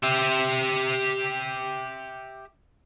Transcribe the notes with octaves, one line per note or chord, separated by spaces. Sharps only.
G4 E5